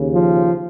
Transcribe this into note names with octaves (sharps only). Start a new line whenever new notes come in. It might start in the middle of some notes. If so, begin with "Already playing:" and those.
Already playing: D#2 C#3
F3